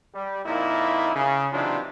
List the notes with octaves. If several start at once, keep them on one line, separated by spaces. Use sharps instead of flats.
G3
F2 A#2 A#3 D#4 E4
C#3
C3 E3 F#3 D4 D#4 F4